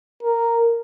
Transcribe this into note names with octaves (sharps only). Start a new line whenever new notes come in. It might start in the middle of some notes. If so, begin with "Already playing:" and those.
A#4